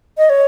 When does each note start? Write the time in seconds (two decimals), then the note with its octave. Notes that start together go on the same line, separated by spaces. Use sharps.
0.18 D#5
0.29 C#5